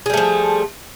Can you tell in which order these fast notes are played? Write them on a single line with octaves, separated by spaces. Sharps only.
G#4 G3 A3 F3